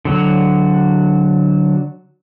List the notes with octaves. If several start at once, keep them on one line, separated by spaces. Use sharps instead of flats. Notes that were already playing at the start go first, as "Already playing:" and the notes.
D3 F#3